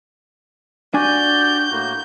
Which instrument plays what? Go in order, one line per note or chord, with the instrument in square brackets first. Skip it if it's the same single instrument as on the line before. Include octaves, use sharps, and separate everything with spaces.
[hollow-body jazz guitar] D4 G#5 [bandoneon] F#4 G4 D5 [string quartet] G6
[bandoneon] A2 A#3 F#4